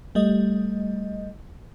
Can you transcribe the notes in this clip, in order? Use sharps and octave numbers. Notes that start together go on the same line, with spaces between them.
G3 A3 D#5